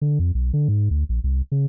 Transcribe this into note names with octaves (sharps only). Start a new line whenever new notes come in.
D3
F2
B1
D3
G#2
D2
A#1
C2
C#3